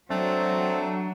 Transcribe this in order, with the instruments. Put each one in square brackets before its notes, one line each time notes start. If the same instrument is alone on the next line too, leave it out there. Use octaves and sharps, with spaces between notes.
[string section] F#3 [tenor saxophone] A3 [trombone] C4 [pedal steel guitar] D4